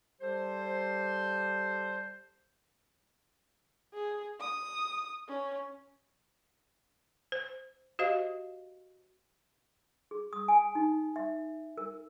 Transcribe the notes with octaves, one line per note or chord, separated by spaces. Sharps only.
G3 G4 A4 C5
G#4
D#6
C#4
C5
F#4 G4 C5 D#5 F5
G#4
D#6
G#5
D#4
E5
A#4